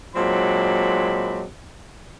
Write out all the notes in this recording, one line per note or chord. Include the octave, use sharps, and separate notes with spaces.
A#2 F#3 G#3 C4 D4 B5